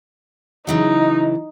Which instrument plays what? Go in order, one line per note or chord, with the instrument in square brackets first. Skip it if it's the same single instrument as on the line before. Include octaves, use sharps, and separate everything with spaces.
[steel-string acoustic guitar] C#3 E3 F#3 [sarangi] D#4